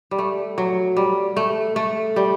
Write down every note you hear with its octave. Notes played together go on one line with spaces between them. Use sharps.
G3
A3
F#3
G3
A3
A3
G3